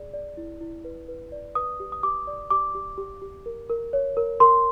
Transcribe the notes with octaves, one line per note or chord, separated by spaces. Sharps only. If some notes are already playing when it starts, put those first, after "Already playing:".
Already playing: G#4 D5
D5
E4
E4
B4
B4
D5
B4 D#6
G4
D#6
G4 D6
D5
G4 D6
G4
G4
G4
A#4
A#4
C#5
A#4
A#4 C6